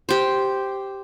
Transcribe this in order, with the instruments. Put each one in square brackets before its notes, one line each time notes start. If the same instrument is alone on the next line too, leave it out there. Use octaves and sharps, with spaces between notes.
[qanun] G4 C5